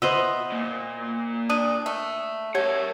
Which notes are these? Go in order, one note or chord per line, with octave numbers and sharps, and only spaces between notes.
B3 C5 D#5 E5 E6
A#2 A#3
D4 D#6 D#7
A3
A3 G4 A#4 C#5 F#5 G#6